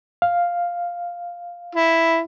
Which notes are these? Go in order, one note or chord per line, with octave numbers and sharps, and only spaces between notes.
F5
E4